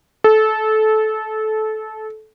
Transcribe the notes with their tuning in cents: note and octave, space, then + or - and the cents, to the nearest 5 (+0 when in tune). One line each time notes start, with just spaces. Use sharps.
A4 -20